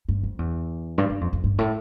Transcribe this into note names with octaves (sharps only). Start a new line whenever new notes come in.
G2
F2
E2
G2
G2
F2
F2
G2
A2